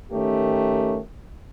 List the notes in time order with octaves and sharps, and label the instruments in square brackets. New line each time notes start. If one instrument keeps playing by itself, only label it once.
[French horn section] D#3 A3 C#4 G4 A#4